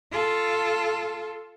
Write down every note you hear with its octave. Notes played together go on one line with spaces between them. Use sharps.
F4 A4